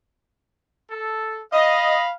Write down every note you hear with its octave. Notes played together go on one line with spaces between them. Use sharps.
A4
D#5 F5 B5